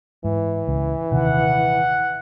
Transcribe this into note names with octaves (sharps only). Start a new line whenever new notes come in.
G#2 E3
C#2
D#1 C3 D#3 F#5